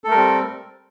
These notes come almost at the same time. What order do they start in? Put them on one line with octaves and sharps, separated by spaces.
A4 A3 A#4 G3 C4